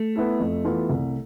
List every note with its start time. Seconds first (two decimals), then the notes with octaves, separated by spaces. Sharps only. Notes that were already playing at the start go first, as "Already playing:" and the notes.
Already playing: A3
0.16 B3 E4 A4
0.40 F2
0.65 E3 B3 F4 A4
0.90 C2